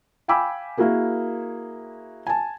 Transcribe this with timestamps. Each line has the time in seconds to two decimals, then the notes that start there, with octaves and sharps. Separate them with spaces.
0.28 F5 G5 G#5 B5 D6 E6
0.78 A#3 E4 F#4 G#4 A#4
2.27 G#5 A5